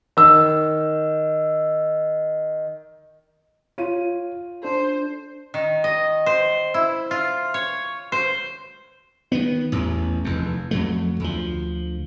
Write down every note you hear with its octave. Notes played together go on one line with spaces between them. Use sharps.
D#3 E6
F4 C#5 D#7
D4 A4 C5
D#3
D#5
C5
E4
F4
C#5
C5
D#3 B3
A1 E2
F1 E2
F2 F#3 A3
D2 F3